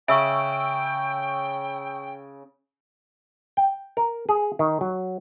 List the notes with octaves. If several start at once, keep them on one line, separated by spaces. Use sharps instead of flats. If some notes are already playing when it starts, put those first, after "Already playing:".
C#3 E5 G5 C#6 E6 D7
G5
A#4
G#4
D#3
F#3